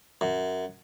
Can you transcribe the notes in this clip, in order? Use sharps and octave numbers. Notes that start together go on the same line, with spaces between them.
F#2